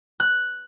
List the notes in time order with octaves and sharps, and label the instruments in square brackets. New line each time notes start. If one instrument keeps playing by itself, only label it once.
[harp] F#6